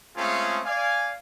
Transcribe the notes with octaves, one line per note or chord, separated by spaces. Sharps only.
G#3 A3 C4 C#4 F4 G#4
D5 F5 G#5